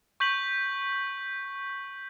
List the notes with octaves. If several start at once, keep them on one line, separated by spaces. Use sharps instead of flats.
C#6 G6 B6 F#7